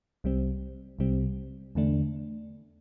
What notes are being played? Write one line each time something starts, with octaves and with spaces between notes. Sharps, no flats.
C2 C3 G3 C4
C2 C3 G3 C4
E2 D3 A3 D4